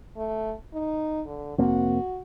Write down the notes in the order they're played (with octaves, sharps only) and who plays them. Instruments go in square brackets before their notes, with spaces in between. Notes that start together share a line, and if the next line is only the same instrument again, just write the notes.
[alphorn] A3
D#4
D3
[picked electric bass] F1 A#3 C4 [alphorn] F#4